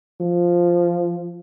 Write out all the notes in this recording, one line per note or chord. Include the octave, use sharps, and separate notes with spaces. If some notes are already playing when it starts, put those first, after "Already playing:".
F3